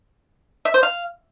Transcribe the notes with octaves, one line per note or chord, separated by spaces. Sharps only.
E5
C5
F5